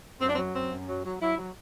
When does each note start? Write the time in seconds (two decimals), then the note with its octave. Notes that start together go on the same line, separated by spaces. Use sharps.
0.21 F#2 C4
0.29 D4
0.35 C4
0.38 F#3
0.54 F#2 C4
0.70 F#2
0.88 F#3
1.05 F#3
1.21 F#3 E4
1.38 F#3